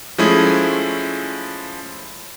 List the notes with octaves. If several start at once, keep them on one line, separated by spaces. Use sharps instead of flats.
F3 G#3 A3 C#4 E4 G#4